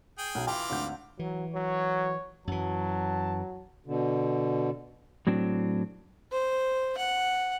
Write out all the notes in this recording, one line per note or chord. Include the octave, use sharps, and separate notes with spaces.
G#4 G5
B1
E3 F4 G5 D6
G#1 D2 G6
E3 F#3
F#3 C#5
F#2 E3 F#3 A5
B2 D3
A2 F#3 C4 D4
C5
F#5